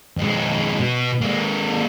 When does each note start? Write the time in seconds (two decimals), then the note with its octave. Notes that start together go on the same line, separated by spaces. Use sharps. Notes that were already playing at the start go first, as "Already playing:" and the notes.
0.17 F2 G#3
0.79 B2
1.21 G#3 A#3